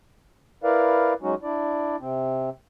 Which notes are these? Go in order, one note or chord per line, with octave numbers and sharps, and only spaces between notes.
E4 A#4 B4 D5 F5
F#3 G#3 C#4 D#4 F#4
D4 E4 D5
C3 C4